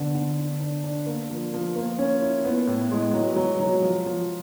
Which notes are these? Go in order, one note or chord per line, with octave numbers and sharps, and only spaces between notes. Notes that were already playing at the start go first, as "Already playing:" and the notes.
Already playing: D3 B3
D3
D4
D4
D4
A#3
F3
F3
A#3
C#4
E4
B3
A2
G#3
F#3
F#3
F#3
F3
F3